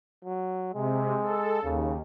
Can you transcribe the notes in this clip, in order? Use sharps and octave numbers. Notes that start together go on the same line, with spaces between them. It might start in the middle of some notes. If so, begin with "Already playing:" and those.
F#3
C3 G#3
A4
D#2 C#3